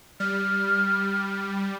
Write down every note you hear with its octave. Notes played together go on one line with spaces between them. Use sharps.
G3 F6